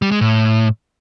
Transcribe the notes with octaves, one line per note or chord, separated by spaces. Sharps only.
G3
G#3
A2